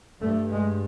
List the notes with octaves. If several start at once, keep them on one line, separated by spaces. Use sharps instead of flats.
G2 A3
G#3